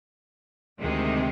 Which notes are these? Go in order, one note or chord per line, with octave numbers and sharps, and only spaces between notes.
D2 C3 D#3 G#3